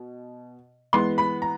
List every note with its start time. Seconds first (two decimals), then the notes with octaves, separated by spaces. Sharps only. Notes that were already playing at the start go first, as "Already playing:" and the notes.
Already playing: B2
0.93 E3 G#3 B3 C6
1.18 B5
1.42 A#5